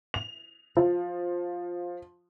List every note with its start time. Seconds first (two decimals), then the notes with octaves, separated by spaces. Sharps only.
0.14 F7
0.77 F3